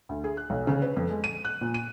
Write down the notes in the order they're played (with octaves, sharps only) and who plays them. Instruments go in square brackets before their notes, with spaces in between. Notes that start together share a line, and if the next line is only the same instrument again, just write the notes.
[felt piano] D2
G#4
F#6
B1
C#3
B4
F2
G#3
D#7
F#6
A#2
D#7